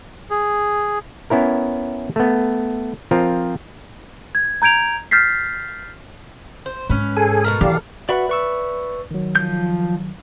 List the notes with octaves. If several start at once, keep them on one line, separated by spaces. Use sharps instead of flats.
G#4
B3 C#4 E4 A#4
A3 B3
F3 C4 F4 A#4
G#6
A#5 G6 G#6 D7 F7
F6 G6 A6 B6 C7
C5
G#2 C#4 B4
G#4 A4 G#5
B2 A4 A#4
E3 G4 D5 F5
F#4 B4 D5 E5 F#5 B5
B4 C#6 E6
D#3 F#3
F3 G6